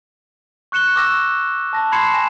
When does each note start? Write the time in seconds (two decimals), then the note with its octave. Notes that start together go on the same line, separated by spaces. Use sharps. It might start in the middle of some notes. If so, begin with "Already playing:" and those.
0.72 C#6 F#6 C#7 E7 G7
0.95 C#6 D6 E6 A#6 E7
1.73 A5 A#6
1.92 B5 C6 G#6 C7 C#7 E7
2.14 G#5 A#6 E7